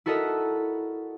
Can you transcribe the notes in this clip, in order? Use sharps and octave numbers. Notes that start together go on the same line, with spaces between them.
E4 F#4 A4 A#4 D#5 E5